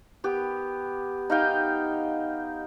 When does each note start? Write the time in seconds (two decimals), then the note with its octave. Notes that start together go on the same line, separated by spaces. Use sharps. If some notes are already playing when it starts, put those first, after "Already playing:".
0.24 B3 G4
1.30 D#4 F5 G5